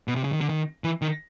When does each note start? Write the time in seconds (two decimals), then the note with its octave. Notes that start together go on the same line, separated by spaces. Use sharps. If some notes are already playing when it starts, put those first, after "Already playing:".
0.08 B2
0.16 C3
0.24 C#3
0.33 D#3
0.41 D3
0.49 D#3
0.84 E3
1.02 D#3